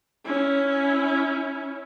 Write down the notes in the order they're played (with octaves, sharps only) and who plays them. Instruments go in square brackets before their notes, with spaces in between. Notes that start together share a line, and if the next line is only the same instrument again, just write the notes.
[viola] C#4 E4